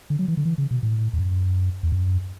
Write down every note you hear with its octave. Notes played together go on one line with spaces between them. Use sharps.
D3
F#3
E3
D3
E3
C#3
B2
A2
E2
F#2
E2
F#2